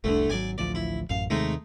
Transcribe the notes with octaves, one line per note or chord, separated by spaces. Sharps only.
F1 C2 D3 A3
G#1 F#3 D5 G#5
A1 D2 F3 D5
E4
A1 F#2 F5
D#2 C3 D#3 G#3 A3 D#4